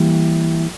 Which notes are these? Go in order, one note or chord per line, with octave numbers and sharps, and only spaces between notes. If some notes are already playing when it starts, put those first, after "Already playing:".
Already playing: E3 G3 A#3